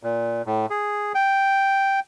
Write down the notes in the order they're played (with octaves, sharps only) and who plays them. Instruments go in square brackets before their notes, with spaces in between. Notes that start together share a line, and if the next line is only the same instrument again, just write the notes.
[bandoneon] A#2
A2
G#4
G5